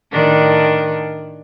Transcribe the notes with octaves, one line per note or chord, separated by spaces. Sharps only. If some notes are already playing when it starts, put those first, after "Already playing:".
A2 D#3 D4